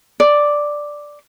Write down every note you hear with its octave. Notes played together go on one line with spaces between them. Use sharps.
D5